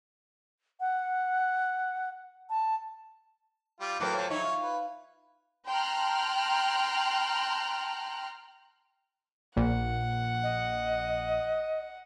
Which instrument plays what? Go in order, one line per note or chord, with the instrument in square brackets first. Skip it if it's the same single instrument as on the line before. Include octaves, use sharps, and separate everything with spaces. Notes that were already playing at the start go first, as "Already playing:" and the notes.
[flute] F#5
A5
[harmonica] G3 F4
[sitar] A2 F#3 C5 [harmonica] A#3 B3
[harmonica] F3
[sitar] F#3 D#4 E4 [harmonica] C#5
[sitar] F4
[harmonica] B4
[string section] G5 A5 A#5 C6 F6 F#6
[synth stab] A#1 [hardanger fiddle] F#5
[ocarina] D#5